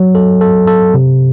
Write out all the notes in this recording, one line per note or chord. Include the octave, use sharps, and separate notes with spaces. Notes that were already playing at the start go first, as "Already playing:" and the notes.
Already playing: F#3
A4
A4
A4
C3